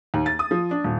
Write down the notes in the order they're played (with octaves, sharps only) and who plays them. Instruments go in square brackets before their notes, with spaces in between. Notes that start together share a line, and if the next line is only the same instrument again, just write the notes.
[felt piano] D#2
A6
D#6
F3
D4
D#1